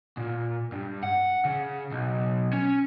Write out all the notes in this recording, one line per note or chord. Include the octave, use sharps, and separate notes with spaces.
A#2
G2
F#5
C#3
B1
C#4